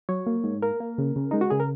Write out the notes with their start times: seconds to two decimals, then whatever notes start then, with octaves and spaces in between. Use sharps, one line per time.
0.09 F#3 C#5
0.26 A#3
0.44 G#2
0.62 A#3 A#4
0.80 A#3
0.98 C#3
1.16 C#3
1.31 G#3 D#4
1.41 F#4
1.50 C#3 G#4
1.60 A#4